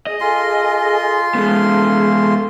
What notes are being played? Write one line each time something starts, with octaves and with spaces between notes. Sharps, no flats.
G#4 D#5
F4 G#4 A4 G#5 C6
G#3 B3 G#4 A4